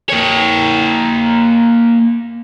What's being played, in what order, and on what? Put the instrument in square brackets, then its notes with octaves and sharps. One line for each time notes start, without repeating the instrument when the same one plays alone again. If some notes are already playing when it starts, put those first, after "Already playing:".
[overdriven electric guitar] A#3 C#5